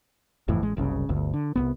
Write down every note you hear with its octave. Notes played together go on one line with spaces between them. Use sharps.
G1 F2 A2 E3
A1 G#3
F#1 C2 C#3
G1 D2
D3
C2 F2 B3